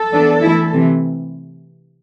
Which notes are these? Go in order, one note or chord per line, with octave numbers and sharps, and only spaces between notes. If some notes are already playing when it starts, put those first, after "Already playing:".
Already playing: A4
E3 B3 D4
E3 A3 E4
C3 E3